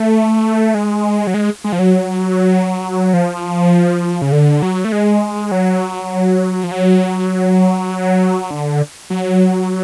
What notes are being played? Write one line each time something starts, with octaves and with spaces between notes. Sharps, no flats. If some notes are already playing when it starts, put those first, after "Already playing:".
Already playing: A3
G#3
F#3
G#3
G#3
F3
F#3
F3
C#3
D3
F#3
A3
G#3
F#3
F3
F#3
D3
F#3